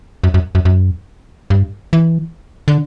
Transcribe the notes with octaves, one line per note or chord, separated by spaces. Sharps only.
F#2
F#2
F#2
F#2
G2
E3
D3